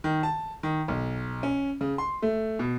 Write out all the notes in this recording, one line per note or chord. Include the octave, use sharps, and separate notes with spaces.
D#3
A5
D#3
B1
C#4
C#3
C6
A3
B2